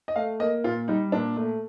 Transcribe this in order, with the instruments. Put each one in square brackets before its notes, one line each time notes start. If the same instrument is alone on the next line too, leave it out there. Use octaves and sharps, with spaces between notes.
[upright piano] D#5
A3 F5
A#3 D#5
A#2 F4
G3 D#4
A#2 D4
A3